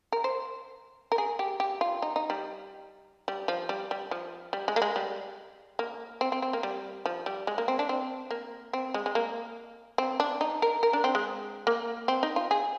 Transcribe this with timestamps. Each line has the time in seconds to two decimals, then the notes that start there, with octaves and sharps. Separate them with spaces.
0.12 A#4
0.24 C5
1.12 A#4
1.18 G#4
1.39 G4
1.60 G4
1.81 F4
2.02 D#4
2.16 D#4
2.30 G3
3.28 G3
3.48 F3
3.69 G3
3.91 G3
4.11 F3
4.53 G3
4.68 G#3
4.76 A#3
4.82 G#3
4.96 G3
5.79 A#3
6.21 C4
6.32 C4
6.42 C4
6.53 A#3
6.63 G3
7.06 F3
7.26 G3
7.47 G#3
7.58 A#3
7.68 C4
7.79 D4
7.89 C4
8.31 A#3
8.73 C4
8.94 G#3
9.06 G#3
9.15 A#3
9.98 C4
10.20 D4
10.41 D#4
10.62 A#4
10.83 A#4
10.93 D4
11.04 C4
11.15 G#3
11.67 A#3
12.08 C4
12.23 D#4
12.36 F4
12.51 G#4